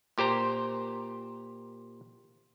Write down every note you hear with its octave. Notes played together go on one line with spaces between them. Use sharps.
A#2 G4 C5 A#5